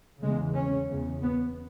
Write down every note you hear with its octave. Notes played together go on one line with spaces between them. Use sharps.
E2 C#3 G#3
C#4
E2 C#3
B3